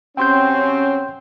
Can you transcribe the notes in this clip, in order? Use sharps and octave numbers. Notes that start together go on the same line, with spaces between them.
C3 F#3 C4 C#4 G5 C6 G6